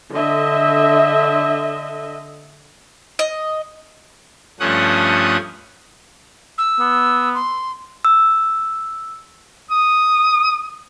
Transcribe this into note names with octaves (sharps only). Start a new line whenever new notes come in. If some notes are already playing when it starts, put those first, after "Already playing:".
D3 D#5 E5
D#5
G2 F3 A3 C#4 F#5 D#6
E6
B3
C6
E6
D#6